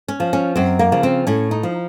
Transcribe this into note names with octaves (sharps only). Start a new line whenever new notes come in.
C#4
F3
C#4
F#2 C4
A#3
C#3 F3
C4
A2 C#4
D#4
F3